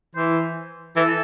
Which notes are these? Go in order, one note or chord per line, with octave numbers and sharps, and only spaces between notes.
E3 C5
E3 A4